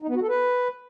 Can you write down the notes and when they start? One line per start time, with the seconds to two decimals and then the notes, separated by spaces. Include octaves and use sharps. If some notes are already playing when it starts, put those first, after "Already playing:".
0.02 D#4
0.09 B3
0.16 F#4
0.22 A4
0.29 B4